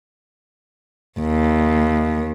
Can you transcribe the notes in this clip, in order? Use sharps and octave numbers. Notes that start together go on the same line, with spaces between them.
D#2